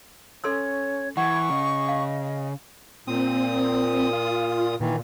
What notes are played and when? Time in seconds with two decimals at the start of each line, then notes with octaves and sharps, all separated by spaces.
0.44 C#4 A4 C#5 C6 E6 G#6
1.17 E3 F#5 G#5 C#6 G#6
1.50 C#3 D#5
1.88 F5
3.07 A#2 C4 D#6
4.13 F4
4.80 A#2 D#3 E3